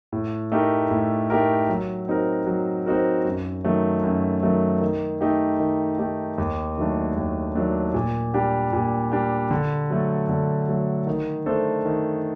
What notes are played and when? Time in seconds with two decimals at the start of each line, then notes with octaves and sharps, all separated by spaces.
0.12 A2
0.52 A3 D#4 G4 A#4
0.91 A2
1.30 A3 D#4 G4 A#4
1.69 F#3
2.08 C4 D#4 F#4 A#4
2.47 F#3
2.86 C4 D#4 F#4 A#4
3.25 F#2
3.64 D#3 F#3 A3
4.03 F#2
4.43 D#3 F#3 A3
4.81 D#3
5.21 A3 D#4 G4
5.60 D#3
5.99 A3 D#4 G4
6.38 D#2
6.78 D#3 F#3 A3 D4
7.16 D#2
7.55 D#3 F#3 A3 D4
7.94 A#2
8.34 G3 D4 G4
8.73 A#2
9.12 G3 D4 G4
9.51 D3
9.90 F#3 A3
10.29 D3
10.68 F#3 A3
11.07 D#3
11.46 A3 D4 A4 C5
11.85 D#3